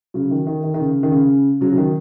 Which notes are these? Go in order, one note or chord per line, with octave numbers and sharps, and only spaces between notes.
C#3 F#3
D#3
D#3
D#3
D#3
C#3
D#3
C#3
C#3 F#3
F#3
D#3